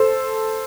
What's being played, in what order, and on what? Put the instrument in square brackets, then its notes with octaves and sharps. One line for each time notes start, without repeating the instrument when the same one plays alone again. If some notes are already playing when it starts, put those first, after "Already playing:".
Already playing: [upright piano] A4 C5